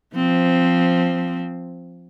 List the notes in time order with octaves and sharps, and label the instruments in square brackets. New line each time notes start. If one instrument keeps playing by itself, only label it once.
[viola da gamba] F3 C4